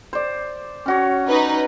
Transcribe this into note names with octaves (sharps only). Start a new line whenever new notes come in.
C5 D5
C#4 F#4 C#5
D#4 B4